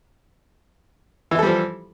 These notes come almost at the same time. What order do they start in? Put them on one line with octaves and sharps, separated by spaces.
E3 E4 A4 G3 F3